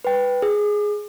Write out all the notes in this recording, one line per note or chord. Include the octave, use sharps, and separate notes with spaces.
B4 G5
G#4